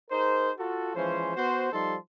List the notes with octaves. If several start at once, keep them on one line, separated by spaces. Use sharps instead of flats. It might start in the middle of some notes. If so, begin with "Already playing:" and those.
D#4 G#4 A#4 C5
F4 F#4 A4
E3 F3 G#3 C#4 C5
B3 F#4 C5
F3 G3 D#4 A4 A5 C6